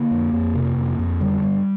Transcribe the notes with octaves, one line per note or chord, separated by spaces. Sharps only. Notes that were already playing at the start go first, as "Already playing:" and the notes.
Already playing: D3 A#3
F2
F2
C3
F2
F2
D3 G3
G2